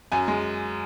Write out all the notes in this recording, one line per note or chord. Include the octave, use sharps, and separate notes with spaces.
F#2 G#5
G#3